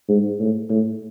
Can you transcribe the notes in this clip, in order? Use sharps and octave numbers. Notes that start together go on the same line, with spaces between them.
G#2
A2
A2